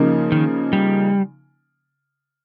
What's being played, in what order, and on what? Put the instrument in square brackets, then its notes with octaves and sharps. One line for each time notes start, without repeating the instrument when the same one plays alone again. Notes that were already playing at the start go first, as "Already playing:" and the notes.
Already playing: [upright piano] C#3 F3 A#3 D#4
[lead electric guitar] D#3
G3